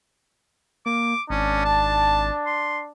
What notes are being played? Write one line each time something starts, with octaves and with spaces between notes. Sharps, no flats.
A#3 D6
G#1 C#4 D4
A5
C6